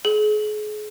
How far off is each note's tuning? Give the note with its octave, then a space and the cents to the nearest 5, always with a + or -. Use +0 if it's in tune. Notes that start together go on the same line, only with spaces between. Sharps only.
G#4 +35